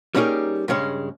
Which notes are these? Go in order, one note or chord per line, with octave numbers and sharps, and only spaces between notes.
G3 A#3 C#4 D#4 G#4 A#4
G2 C#3 G#3 C#4